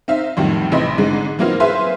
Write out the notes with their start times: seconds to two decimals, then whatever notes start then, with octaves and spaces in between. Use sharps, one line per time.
0.08 C4 D#4 E5 F5
0.37 F2 A2 D#3 F#3 G3
0.72 A1 C3 E3 D#5 B5 C6
0.98 G#2 D3 G#3
1.39 E3 F#3 A#3 C4 D#4 F4
1.60 G#4 B4 C5 E5 F5 C6